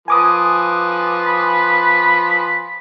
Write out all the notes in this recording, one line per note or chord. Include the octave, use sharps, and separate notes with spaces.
F3 B4 G#5 D6 D#6
B5